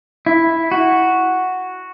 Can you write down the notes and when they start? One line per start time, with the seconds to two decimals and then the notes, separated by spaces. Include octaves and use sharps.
0.26 E4
0.71 F#4